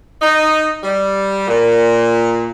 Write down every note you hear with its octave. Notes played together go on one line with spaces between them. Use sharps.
D#4
G3
A#2